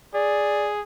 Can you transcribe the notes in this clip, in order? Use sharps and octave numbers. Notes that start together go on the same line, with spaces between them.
G#4 D5